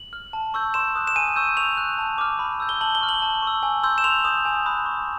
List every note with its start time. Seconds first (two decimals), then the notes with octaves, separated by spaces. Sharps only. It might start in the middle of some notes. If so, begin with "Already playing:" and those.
Already playing: F#7
0.13 F6
0.33 A5
0.54 C#6 E6 G6
0.74 C6 E7
0.96 D#6 F#6
1.07 E7
1.16 G#5 D#7
1.36 C#6 E6 G6
1.57 C#6 F7
1.77 F#6
1.98 A5
2.18 D6 F6
2.39 B5
2.60 E6 G6
2.69 G7
2.81 A5 F#7
2.95 G7
3.01 C#6 F6
3.09 F#7
3.22 A5
3.42 C#6
3.47 E6
3.63 G#5
3.83 C6 E6 G6
3.98 E7
4.04 C6 F7
4.25 D#6 G6
4.45 G#5
4.66 B5 D#6 F#6
4.86 C#6